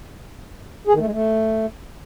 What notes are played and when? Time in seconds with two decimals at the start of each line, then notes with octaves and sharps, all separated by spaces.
0.87 G#4
0.93 D#3
1.00 A3
1.06 G#3
1.12 A3